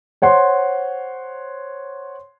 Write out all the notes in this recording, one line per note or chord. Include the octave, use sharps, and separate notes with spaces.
C5 C#5 F#5 C6